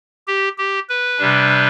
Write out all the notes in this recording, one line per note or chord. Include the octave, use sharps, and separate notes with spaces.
G4
G4
B4
C3 G3 D4